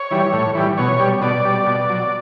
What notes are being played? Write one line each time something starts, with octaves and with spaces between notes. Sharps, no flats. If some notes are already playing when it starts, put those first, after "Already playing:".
Already playing: C#5
E3 G3
A2
E3 G3
B2 C#5
G3
B2 D5
G3
B2
F#3